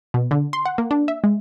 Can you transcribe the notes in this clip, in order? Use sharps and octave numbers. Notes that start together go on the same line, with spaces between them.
B2
D3
C6
F#5
A#3
D4
E5
G#3